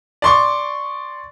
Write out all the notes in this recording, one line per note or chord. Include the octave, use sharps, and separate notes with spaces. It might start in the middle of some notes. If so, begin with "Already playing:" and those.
D5 C6 C#6